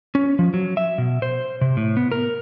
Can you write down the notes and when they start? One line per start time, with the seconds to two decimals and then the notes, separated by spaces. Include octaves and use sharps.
0.15 C#4
0.39 F3
0.54 F#3
0.77 E5
0.98 B2
1.22 C5
1.61 C3
1.77 A2
1.97 B3
2.12 A#4